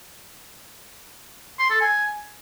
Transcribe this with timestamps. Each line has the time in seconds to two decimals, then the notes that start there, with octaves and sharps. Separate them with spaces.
1.59 C6
1.70 A4
1.81 G#5